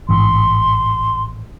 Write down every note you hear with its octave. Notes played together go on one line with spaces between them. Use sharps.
A1 G#2 E3 C6